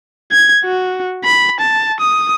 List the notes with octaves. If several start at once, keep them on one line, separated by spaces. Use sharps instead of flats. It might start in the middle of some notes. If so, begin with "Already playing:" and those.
G#6
F#4
B5
A5
D#6